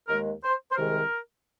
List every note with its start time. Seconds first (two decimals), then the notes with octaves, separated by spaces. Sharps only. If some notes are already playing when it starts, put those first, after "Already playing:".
0.08 D#2 D#3 G#3 A#4
0.43 C5
0.70 C5
0.76 C2 C3 D#3 G#3 A#4